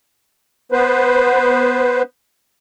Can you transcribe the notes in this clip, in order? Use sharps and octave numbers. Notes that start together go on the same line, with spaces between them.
B3 B4 C5